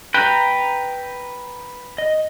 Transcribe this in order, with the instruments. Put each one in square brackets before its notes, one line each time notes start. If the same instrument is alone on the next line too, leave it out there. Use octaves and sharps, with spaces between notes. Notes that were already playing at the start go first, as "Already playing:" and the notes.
[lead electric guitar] B4 G5 [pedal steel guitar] A#5 F#6
[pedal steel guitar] D#5